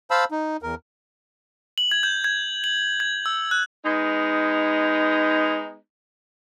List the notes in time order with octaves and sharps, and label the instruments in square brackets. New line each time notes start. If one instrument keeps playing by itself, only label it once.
[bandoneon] C5 F5 A5 B5 E6
D#4
E2 A#4
[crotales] F#7
G#6
G6
G#6
F#7
G#6
E6
F#6
[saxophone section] G#3 B3 D#4